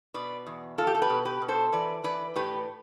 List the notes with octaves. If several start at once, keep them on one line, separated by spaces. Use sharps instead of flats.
B2 B4 D5
E2
E2 F4 A4
G4
A4
G4 B4
B2
G4 B4
B2
A4 C5
E3 B4 D5
E3 B4 D5
A2 G4 B4